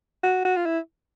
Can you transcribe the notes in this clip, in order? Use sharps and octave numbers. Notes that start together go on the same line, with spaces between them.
F#4
F#4
F4
E4